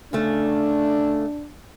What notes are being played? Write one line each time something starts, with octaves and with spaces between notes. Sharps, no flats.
C#3 A3 D4